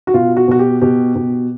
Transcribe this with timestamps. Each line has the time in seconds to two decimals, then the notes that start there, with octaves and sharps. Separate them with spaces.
0.07 F#4
0.14 B2 F4
0.37 F#4
0.48 B2 F#4
0.59 G4
0.81 B2 G4
1.15 B2